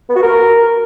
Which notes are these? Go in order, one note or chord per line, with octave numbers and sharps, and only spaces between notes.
B3
F#4
A#4